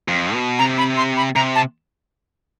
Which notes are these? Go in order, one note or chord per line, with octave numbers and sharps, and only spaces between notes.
F2
B2
C3 A#5
B5
C6
B5
C3 A#5
A5